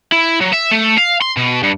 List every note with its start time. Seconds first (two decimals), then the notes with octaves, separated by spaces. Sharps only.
0.12 E4
0.40 F#3
0.53 E5
0.71 A3
0.98 F5
1.22 C6
1.37 B2
1.63 G2